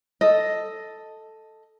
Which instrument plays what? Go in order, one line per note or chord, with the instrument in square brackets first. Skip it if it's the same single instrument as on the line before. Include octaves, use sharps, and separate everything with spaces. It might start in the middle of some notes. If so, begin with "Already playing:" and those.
[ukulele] A4 D#5